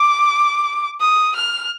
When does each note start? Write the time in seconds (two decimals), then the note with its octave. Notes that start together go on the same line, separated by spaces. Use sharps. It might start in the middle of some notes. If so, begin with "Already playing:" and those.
Already playing: D6
1.00 D#6
1.35 F6